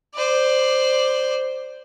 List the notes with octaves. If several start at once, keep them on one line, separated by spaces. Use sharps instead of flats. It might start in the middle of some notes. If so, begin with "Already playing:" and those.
C5 D5